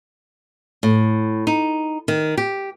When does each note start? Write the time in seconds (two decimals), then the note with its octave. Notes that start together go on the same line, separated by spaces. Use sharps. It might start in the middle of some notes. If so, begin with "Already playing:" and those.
0.83 A2
1.47 D#4
2.08 D#3
2.37 G4